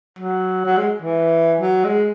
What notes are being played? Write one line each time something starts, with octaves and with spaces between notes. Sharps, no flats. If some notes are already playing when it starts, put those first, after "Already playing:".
F#3
F#3
G#3
E3
F#3
G#3